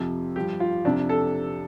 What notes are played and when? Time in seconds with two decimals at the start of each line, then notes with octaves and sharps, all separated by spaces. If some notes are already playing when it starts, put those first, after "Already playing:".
Already playing: F2 C3 F3
0.36 G2 F3 G4
0.60 F4
0.84 F2 C3 F3 D4
1.09 A4